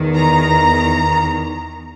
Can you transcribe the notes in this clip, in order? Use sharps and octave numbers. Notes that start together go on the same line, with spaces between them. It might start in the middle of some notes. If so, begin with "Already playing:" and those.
Already playing: E2 D#3
A#5